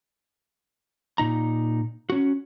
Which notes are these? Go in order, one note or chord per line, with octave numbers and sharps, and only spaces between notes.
A#2 D#4 A#5
C#4 F#4